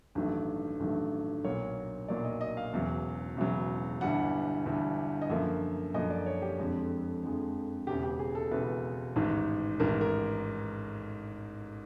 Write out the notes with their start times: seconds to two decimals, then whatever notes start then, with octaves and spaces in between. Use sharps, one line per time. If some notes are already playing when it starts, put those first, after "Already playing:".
0.15 A1 G2 D#3 F#3 A3
0.80 A1 G2 D#3 F#3 A3
1.44 B1 A#2 F#3 A#3 C#5
2.08 B1 A#2 F#3 A#3 D5
2.24 D#5
2.41 D#5
2.57 F5
2.73 E1 E2 C#3 F#3
3.37 E1 E2 C#3 F#3
4.01 G1 G2 E3 G3 F#5
4.65 G1 G2 E3 G3
5.22 D#5
5.30 F#2 D3 F3 A#3 E5
5.94 F#2 D3 F3 A#3 D#5
6.10 D5
6.26 C#5
6.42 G4
6.58 F2 D3 F3 G#3
7.23 F2 D3 F3 G#3
7.87 E1 E2 C#3 G4
8.03 G4
8.19 G#4
8.35 A4
8.51 E1 E2 C#3 B4
9.16 A1 G#2 D#3
9.80 A1 G#2 D#3 A#4
10.01 A#4